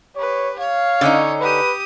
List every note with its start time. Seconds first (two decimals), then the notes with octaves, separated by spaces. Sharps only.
0.16 G4 B4 C#5
0.59 C#5 F5
1.01 D3 C#4 D#4
1.41 G4 B4 D#6